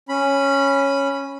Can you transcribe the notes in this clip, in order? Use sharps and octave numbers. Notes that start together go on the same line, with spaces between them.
C#4 B5